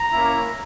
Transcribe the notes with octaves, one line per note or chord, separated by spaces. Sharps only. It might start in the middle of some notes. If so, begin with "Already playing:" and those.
Already playing: A#5
A#3 C#4 E4